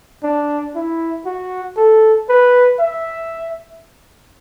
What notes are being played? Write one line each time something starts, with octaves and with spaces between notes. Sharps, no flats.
D4
E4
F#4
A4
B4
E5